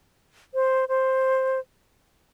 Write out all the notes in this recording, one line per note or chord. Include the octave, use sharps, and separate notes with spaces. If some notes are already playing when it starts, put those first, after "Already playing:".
C5
C5